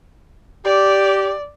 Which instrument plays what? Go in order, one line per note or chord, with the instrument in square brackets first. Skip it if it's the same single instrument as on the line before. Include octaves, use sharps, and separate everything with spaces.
[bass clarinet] G4 [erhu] D5